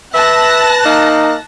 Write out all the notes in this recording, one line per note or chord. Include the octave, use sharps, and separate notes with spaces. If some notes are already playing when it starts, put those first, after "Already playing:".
B4 E5 A5 F#6 A#6
A#3 D#4